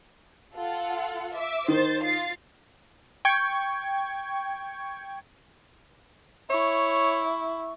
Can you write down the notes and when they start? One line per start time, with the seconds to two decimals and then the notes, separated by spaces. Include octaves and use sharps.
0.55 F4 A4 F#5
1.34 E5 D6
1.68 D#3 C5 A6
2.02 F4 A6 C7
3.25 G5 C#6 G#6
6.50 E4 C#5 C#6